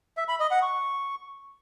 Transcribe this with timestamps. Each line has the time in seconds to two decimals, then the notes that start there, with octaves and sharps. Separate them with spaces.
0.17 E5
0.28 B5
0.40 D#5
0.51 F#5
0.62 C#6